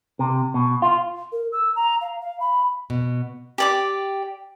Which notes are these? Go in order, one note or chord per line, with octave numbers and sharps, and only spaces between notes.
C3
B2
F4
A#4
E6
A#5
F5
F5
B5
B2
G4 D5 D6